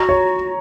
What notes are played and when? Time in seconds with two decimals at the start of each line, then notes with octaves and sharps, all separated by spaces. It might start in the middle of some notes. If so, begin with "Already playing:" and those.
Already playing: F#4 A#5
0.09 C#5